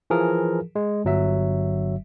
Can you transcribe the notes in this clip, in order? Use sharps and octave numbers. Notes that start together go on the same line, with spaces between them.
E3 F3 G#4 A#4
G#3
G1 F#3 E5